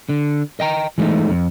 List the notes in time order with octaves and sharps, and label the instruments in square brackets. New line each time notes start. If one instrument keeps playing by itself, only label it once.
[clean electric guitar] D3
D#5 G5 A#5
E3 G#3 A3 D#4
F2